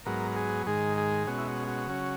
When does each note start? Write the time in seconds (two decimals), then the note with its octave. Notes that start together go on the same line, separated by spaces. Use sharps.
0.06 G#2 F#3 B3 A#4
0.31 A#4
0.36 G#4
0.66 G#2 D#3 G#3 G#4
0.98 G#4
1.27 B2 G#3 C#4 F#4
1.38 E4
1.48 F#4
1.68 F#4
1.87 C#3 F#3 C#4